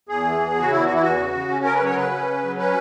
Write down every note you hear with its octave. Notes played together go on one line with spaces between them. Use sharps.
E2 G#4
E3
E2
C#3 F#4
E2 E4
E3 F#4
E4
E2 F#4
C#3
C#3
C#4
C#3 A#4
B4
F#3 C#5
A#4
C#3 B4
C#4
C#3
F#3
C#4 B4